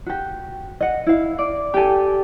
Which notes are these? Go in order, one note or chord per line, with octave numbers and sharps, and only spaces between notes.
F#4 G4
D#5 F#5
E4 F5
D5
G4 A4 G5 G#5